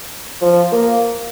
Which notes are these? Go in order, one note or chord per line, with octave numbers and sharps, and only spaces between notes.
F3
A#3